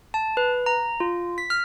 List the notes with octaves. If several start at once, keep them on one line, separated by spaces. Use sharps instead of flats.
A5
B4
A#5
F4
B6
F6